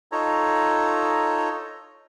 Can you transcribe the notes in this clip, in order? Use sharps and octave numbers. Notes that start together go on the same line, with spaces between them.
D#4 F4 A4 C#5 A#5